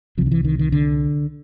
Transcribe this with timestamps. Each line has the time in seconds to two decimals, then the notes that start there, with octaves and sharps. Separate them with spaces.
0.18 C3 F3
0.21 C2
0.26 D#3
0.31 E3
0.45 D#3
0.59 D#3
0.72 D3